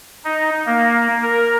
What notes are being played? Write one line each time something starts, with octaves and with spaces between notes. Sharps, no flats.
D#4
A#3
A#4